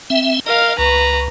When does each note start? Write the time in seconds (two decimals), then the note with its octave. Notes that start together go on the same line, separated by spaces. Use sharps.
0.10 C4 E5
0.46 A#4 D#5 F5
0.78 C#2 B4 A#5